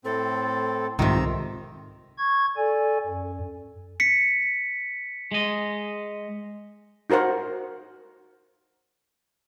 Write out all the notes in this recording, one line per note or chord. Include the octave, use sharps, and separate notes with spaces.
A2 C4 A4
C2 G#2 C3 D#3 F4 A#5 E6
C#6 G#6
A4 D5 G#5
F#2
B6 C#7
G#3 D#5
D#4 F#4 A#4 C5 F#5